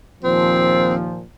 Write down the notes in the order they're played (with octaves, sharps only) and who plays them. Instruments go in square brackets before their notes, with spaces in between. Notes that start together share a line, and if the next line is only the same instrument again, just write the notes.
[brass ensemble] D#2 A#2 F3 [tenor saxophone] C4